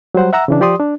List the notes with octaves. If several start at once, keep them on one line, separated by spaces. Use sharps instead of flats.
F#3 G3 C5 F#5
E5 F#5 A#5 E6
C#3 E3 D4
F3 G4 D5 C6 D#6
D4